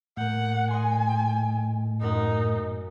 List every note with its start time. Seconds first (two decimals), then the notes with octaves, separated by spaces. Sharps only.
0.17 A2 A#3 F#5 G6
0.71 D#5 G#5 C6
2.01 F#2 D#4 A#4 F#5